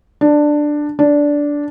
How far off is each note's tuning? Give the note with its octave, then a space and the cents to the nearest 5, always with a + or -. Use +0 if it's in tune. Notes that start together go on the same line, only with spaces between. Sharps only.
D4 +10
D4 -10